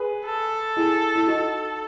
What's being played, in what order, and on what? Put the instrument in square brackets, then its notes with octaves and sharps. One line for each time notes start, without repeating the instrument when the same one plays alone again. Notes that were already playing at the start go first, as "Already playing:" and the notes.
Already playing: [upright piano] G#4 B4
[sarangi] A4
[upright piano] E4 G#4
E4
D#4 F#4